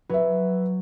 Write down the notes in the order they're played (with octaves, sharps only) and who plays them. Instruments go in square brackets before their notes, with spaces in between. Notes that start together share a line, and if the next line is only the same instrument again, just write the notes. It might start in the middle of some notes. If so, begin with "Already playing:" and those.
[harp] F#3 [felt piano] B4 E5